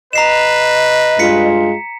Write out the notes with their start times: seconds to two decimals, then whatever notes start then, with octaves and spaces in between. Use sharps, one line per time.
0.13 B4 D#5 A#5 C7 E7
1.19 G2 G#3 F4 B6 C#7